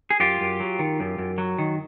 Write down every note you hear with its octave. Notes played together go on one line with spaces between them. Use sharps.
G#4
F#2 F4 G4
F#2
F#3
D#3
F#2
F#2
F#3
D#3